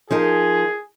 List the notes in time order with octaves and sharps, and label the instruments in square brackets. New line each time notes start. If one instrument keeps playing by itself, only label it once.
[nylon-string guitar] F3 D#4 A#4 [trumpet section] G#4